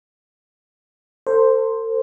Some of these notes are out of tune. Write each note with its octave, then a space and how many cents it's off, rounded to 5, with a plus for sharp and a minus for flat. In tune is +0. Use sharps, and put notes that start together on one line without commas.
A4 +40 C5 +0